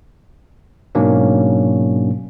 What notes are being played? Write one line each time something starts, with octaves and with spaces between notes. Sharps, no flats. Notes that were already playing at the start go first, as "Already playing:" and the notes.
G#2 B2 F#3 A#3 C#4 D4